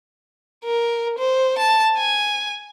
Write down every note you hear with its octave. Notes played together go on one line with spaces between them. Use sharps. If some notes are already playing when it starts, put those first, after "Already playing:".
A#4
C5
A5
G#5